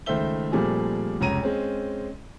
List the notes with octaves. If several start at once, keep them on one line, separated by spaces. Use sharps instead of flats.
C#2 D#3 A3 C5 E5 G7
A#2 F3 G3 A3 C4 G#4
F1 C#2 C#5 A#5 D#7
G#3 C4 C#4